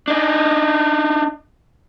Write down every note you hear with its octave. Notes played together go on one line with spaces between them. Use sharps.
D4 D#4